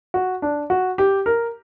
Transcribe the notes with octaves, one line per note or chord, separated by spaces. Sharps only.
F#4
D4
F#4
G4
A#4